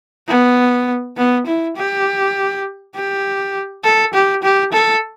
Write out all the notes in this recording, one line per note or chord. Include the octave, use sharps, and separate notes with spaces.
B3
B3
E4
G4
G4
A4
G4
G4
A4